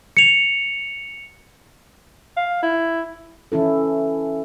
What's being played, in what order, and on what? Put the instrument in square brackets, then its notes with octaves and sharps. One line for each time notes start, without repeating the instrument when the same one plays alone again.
[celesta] C#7 F7
[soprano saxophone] F5
E4
[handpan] E3 C#4 E4 A4